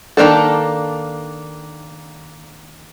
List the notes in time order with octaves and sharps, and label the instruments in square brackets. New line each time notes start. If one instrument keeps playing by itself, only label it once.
[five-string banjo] D#3 A3 A#3 D4 A4